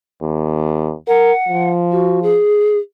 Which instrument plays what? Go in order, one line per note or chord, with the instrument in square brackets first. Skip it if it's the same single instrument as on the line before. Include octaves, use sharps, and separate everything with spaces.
[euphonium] D#2
[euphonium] A#4 [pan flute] F#5
[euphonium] F3
[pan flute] F#4
G#4